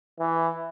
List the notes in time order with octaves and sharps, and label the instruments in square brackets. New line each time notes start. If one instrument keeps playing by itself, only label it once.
[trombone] E3